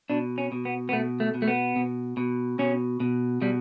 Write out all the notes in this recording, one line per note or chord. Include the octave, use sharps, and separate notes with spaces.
B2 D4
C#4
B2
B3
B3
B2 A3
A3
B2
A3
B3
B2
B2
B2 C#4
B2
B2 G3